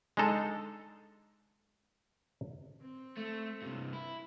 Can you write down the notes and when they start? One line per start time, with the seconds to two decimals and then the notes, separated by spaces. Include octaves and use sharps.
0.17 G#3 D4 D#4 A4
2.80 C4
3.17 A3
3.62 G2 C3
3.93 E4